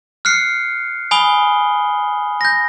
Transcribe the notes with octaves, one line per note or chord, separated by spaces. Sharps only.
F6 F#6 C7 C#7
G#5 B5 D#6 G7
G6 A#6